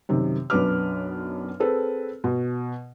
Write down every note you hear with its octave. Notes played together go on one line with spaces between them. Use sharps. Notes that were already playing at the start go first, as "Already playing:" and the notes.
F#2 C3 D#3
B1 F#2 D4 B4 D6 F6
C4 G#4 A4 B4
B2